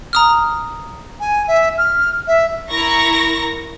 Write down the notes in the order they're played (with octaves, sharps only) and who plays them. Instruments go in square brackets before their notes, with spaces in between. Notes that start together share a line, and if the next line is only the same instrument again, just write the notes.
[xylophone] A#5 D#6 F6
[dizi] G#5
E5
F6
E5
[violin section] E4 A#4 C#6 A#6